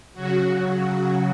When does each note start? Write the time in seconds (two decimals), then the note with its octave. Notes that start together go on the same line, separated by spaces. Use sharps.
0.14 C#3 F#3 F#4
0.50 F#4
0.86 C#3 F#3 F#4